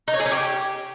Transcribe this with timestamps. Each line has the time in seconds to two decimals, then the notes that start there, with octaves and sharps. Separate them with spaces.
0.08 D#4
0.14 C#5
0.20 G#4
0.26 C#4
0.32 G4